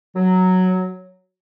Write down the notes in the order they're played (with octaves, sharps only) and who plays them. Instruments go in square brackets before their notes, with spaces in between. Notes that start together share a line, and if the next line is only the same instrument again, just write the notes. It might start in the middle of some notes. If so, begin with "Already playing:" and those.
[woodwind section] F#3